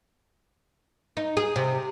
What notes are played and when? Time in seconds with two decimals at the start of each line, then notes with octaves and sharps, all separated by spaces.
1.17 D#4
1.37 G#4
1.56 C3